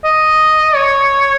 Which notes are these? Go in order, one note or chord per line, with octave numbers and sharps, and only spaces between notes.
D#5
C#5